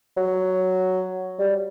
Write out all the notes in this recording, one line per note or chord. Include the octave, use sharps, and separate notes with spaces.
F#3
G3